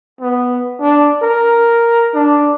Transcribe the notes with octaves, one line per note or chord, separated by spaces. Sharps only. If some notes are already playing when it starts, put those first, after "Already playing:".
B3
D4
A#4
D4